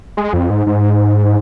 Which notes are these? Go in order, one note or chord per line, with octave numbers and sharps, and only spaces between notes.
G#3
F2
G#2
G#2